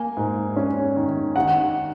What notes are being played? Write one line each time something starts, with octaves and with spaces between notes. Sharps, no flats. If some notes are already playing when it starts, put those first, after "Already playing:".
Already playing: A#3 G#5
G#2
C#4
D#3
D#3 F#5